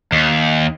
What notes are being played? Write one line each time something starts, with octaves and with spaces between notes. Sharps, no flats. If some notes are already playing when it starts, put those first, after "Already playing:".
D#2